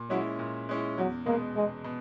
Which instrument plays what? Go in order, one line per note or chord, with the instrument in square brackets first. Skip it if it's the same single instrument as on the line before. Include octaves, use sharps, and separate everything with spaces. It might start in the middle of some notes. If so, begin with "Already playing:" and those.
Already playing: [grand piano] A#2
[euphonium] F#3 [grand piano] G#3 C#4 E4
[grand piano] A#2
G#3 C#4 E4
[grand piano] E2 [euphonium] F#3
[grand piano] B2 G#3 [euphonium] A#3
[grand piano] E2 [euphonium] G#3
[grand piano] B2